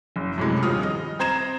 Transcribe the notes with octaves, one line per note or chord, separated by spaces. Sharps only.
F#1
F#2 A2 C3 G#3
D#1 G2 F3 D#6 F6
D#5
C4 C5 A#5 G#6 E7